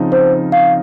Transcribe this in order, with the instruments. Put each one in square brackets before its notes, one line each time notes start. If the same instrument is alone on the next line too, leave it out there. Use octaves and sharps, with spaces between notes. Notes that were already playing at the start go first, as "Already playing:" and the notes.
Already playing: [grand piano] C#3 F3 C4 D#4
[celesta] C5
F5